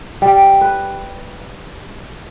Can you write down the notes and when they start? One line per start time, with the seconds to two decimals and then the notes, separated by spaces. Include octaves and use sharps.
0.22 G3
0.61 B4